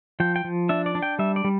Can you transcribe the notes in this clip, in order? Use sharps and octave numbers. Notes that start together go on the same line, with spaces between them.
F3 G5
G5
F3
D4 E5
D5
D4
G5
G3 E5
D5
G3